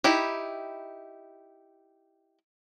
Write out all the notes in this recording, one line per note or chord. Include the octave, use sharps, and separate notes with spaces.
D#4 E4 G4